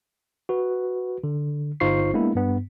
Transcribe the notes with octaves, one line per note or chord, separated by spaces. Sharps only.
F#4 B4
D3
G1 D#4 F4 C5 C#6 C7
G#3 A#3 B3 D4 E4
G2 B3